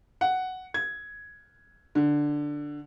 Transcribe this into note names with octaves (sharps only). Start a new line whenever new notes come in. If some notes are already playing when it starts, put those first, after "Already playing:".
F#5
G#6
D3